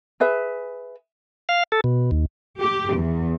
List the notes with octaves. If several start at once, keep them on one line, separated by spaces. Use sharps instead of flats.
G#4 B4 E5
F5
A4
B2
D#2
G4
E2